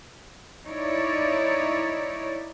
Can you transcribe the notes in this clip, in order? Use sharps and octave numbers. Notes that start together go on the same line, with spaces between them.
D#4 E4 C#5 D5